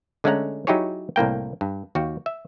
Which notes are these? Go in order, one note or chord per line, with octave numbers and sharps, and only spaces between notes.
D3 G#3 A3 C#4 F#5 A#5
F#3 D#4 E4 G4 G#4 C#5
C2 A2 A#3 G5
G2
D#2 F#4 F5 G5
E5